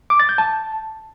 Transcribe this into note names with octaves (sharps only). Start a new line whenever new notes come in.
D6
A6
G6
A5